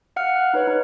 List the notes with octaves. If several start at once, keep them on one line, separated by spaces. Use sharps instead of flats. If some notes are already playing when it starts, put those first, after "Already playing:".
F5 F#5 F6
F#6
D#4 B4 C#5
D#4